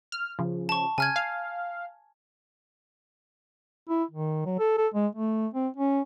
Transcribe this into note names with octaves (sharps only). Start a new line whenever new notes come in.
F6
C#3 F3
A5 C#6
C#3 G#5 F6 G#6
F5
E4
D#3
F#3
A4
A4
G#3
A3
C4
C#4